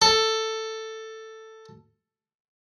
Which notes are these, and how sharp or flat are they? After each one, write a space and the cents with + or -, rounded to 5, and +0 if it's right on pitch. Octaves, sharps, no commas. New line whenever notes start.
A4 +10